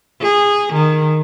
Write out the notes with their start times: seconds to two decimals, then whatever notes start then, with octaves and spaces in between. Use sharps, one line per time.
0.21 G#4
0.73 D#3